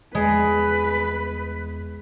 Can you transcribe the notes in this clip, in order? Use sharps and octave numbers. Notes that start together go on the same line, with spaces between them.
E2 G#3 B4